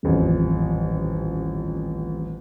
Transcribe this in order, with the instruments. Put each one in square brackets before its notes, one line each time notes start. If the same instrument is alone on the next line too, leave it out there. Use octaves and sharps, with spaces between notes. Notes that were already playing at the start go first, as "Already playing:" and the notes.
[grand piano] D#1 A1 F2